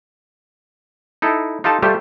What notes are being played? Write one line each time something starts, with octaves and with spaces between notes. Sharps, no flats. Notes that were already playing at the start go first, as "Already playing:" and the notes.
D#4 E4 A4
D#4 F4 G4 A4 A5
G3 A3 F4 G4 A4 C5